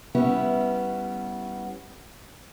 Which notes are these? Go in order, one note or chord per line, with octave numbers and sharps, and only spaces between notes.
G3 B3 C#4 E4